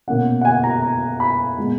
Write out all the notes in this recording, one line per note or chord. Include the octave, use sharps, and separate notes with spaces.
B2 A#3 C#4 F#5
F#5
G#5
A#5
A#5
B5
A#2 G#3 B3